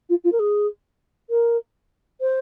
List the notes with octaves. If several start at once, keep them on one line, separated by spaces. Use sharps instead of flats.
F4
F4
A#4
G#4
A#4
C5